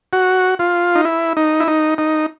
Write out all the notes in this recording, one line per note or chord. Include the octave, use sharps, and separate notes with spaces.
F#4
F4
D#4
E4
D#4
E4
D#4
D#4